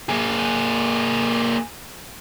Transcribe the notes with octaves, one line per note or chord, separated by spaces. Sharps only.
A#3 G#4